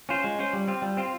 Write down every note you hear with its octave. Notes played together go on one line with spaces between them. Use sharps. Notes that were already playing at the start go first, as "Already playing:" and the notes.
C#4 F4 C5
G#3
C#4 F4 C5
G3
C4 F4
G3
C4 F4